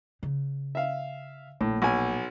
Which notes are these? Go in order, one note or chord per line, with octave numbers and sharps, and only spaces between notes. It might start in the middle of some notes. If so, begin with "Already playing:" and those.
C#3
E5 F5
A#1 A2
B1 G#5